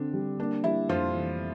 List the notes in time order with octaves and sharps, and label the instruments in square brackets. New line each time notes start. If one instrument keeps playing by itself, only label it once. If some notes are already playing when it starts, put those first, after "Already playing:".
Already playing: [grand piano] D3 C4 [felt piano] D4
[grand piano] G3
[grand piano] A#3 [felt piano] D4
[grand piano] G3 [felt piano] E4
[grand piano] F2 [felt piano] F3 F4
[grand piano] E3